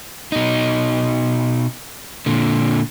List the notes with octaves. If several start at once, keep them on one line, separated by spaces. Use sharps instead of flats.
B2 D#4
A#2 D3